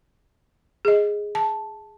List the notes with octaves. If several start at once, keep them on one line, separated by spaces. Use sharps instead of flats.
G#4 D#5
A5